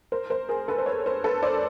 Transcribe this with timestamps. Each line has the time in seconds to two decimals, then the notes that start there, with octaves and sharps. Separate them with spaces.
0.12 A#4 C5
0.30 A#4 C5
0.49 G#4 A#4
0.68 A4 B4
0.78 C5
0.86 B4 C#5
1.06 A#4 C5
1.24 A4 B4
1.43 C5 D5